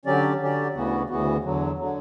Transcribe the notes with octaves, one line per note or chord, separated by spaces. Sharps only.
D3 F#3 C#4 G4 D5
D3 F#3 C#4 G4 D5
D2 C#3 E3 B3 F#4
D2 C#3 E3 B3 F#4
E2 D3 F#3
D3 F#3